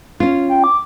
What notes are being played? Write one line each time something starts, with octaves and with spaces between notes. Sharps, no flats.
C#4 F4
G5
D6